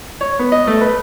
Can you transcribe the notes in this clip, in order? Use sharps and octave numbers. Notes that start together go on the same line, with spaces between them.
C#5
B3
D#5
A3
B4